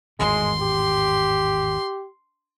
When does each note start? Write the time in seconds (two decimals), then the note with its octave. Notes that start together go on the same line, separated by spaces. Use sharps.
0.19 G#1 E2 A2 G#3 C6
0.61 G4